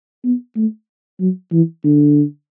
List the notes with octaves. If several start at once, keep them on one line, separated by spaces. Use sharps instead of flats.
B3
A3
F#3
E3
D3